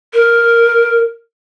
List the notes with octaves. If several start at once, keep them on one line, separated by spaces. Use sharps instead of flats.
A#4